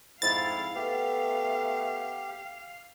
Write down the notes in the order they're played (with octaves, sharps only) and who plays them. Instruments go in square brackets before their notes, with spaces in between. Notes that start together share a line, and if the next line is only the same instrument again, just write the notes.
[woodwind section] F2 G#2 [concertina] E4 [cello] F5 [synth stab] A6
[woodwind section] A3 B3 [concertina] G4